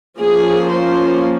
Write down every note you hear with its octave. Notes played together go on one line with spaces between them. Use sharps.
F3 A#3 C#4 G#4
C5